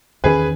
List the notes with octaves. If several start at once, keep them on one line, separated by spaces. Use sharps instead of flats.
E2 D#3 A#3 C#4 G#4 B4